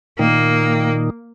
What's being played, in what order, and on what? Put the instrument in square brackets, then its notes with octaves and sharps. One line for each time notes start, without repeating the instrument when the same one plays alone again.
[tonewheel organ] A#2 D#3 [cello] A#3